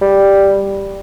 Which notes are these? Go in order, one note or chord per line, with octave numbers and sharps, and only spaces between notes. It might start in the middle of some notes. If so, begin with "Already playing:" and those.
G3